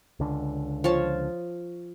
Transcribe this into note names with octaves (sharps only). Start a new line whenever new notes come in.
C#2 D3
F3 C#5 A5